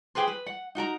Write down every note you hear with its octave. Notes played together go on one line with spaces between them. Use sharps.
G4 G#4 B4 C5
B4
F#5
D#4 F#4 A#4 A#5